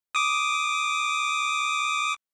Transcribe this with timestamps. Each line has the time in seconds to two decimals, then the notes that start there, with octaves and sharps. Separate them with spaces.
0.15 D6 D#6